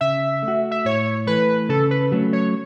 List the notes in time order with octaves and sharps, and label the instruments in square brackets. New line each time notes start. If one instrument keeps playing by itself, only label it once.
[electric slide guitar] C#3 [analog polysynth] E5
[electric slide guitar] A3
F#4
[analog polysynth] E5
[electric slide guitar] A2 [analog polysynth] C#5
[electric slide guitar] E3 A3 [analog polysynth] B4
[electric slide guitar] C#3 [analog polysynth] A4
[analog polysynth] B4
[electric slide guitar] F#3 A3 C#4
[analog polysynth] C#5